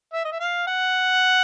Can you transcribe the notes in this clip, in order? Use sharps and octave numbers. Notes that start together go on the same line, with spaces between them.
E5
D#5
E5
F5
F#5